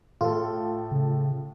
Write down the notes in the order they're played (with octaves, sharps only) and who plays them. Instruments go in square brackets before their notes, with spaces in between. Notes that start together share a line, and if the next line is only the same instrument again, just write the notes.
[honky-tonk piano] A2 A4 [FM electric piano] F4
[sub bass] C#3